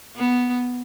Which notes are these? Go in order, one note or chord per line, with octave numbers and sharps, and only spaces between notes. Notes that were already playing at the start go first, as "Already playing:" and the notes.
B3